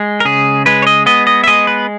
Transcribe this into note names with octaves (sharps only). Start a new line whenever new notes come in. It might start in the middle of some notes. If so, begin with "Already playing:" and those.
Already playing: G#3
A#4
C#3 G#4
G#3 B4
C#5
D#5
B3 D#5
D#5
E5
G#3 D#5
B4